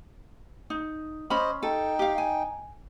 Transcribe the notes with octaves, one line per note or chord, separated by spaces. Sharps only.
D#4
C#4 C5 D#5 B5
D#4 A4 G5
G4 F5
G#5